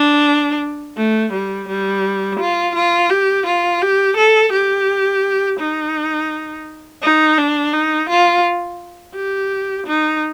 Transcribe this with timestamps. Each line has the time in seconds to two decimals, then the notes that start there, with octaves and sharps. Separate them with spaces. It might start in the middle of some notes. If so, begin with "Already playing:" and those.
Already playing: D4
0.97 A3
1.33 G3
1.69 G3
2.40 F4
2.75 F4
3.10 G4
3.46 F4
3.82 G4
4.17 A4
4.53 G4
5.60 D#4
7.02 D#4
7.38 D4
7.73 D#4
8.09 F4
9.15 G4
9.87 D#4